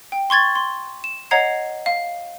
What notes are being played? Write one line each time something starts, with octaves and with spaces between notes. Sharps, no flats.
G5
C6 C#6 G#6 A6
C6
E7
C#5 D#5 F#5 A#5 G#6 C7
F5